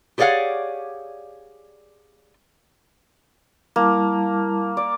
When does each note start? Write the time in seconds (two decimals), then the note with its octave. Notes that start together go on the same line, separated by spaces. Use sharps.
0.18 G4 G#4 C#5 D5 F5 F#5
3.76 G3 A#3 E4 A5
4.77 D5